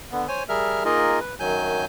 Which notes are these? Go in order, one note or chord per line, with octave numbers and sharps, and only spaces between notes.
D3 B3
C5 C#5 G#5
G3 G#4 A#4 E5 F6
A#3 D#4 F4 G#4 A#4 D#5
B4
F#2 D#3 F#3 G#5 G6